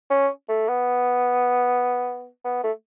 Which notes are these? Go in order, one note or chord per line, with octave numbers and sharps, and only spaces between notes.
C#4
A3
B3
B3
A3